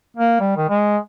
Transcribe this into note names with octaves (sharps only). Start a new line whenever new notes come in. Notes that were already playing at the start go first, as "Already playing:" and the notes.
A#3
G3
D#3
G#3